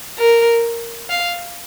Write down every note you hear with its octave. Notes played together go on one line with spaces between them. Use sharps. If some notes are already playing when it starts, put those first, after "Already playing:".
A#4
F5